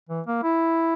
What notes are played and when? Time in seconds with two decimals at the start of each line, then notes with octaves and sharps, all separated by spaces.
0.10 E3
0.27 A#3
0.43 E4